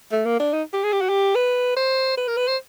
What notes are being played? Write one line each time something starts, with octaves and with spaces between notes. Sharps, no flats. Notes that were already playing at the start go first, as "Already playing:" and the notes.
A3
A#3
D4
D#4
G4
G#4
G4
F#4
G4
B4
C5
B4
A#4
B4
C5